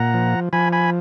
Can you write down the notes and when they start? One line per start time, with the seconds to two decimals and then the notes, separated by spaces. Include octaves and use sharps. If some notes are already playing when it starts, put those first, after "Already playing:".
Already playing: A#2 F#5 A#5
0.14 F3
0.53 F3 G#5 B5
0.73 G#5 B5